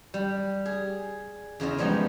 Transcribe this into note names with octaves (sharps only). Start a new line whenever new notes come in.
G3
G#4
E2 C#3 F4 D#5
F3 G3 G#3 B3 D#4